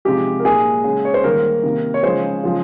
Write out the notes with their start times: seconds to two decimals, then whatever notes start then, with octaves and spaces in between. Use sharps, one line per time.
0.05 C3 F3 G#3 G4
0.39 A#4
0.45 A#2 G#3 G#4
0.84 C#3 G#3
1.05 C#5
1.14 C5
1.24 D#3 G3 A#3 A#4
1.63 C3 D#3 A#3
1.94 C#5
2.03 C#3 F3 G#3 C5
2.44 C#3 F3 G#3